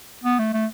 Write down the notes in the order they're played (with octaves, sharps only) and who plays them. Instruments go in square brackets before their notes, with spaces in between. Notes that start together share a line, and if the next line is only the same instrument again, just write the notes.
[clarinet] B3
A3
A3